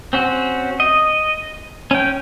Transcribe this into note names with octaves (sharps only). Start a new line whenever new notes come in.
C4 C#4 F#4
D#5
C#4 G5